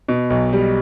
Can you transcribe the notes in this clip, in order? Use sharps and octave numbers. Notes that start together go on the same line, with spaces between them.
B2
B1
G3